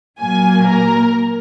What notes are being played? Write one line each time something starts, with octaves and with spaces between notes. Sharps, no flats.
A#2 F#3 A#3 G#5
A#4